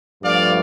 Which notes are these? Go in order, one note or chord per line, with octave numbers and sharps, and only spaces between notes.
G2 F3 A3 D5 F5